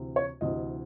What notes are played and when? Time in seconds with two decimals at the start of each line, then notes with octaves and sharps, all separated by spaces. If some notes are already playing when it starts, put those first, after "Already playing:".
Already playing: D2 C3 E3
0.16 C#5
0.41 D2 C3 E3 D#5